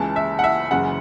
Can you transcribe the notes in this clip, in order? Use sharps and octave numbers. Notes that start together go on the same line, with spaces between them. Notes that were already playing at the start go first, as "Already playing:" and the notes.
Already playing: C#2 C#3 E3 A5
E5
F#5
E5
F#1 F#2 C#3 E3 F#5